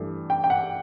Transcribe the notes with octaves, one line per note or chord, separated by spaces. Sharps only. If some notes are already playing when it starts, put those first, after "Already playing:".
Already playing: G2 E3 A3
G5
G5
F#5